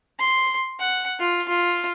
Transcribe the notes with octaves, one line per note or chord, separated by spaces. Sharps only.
C6
F#5
F4
F4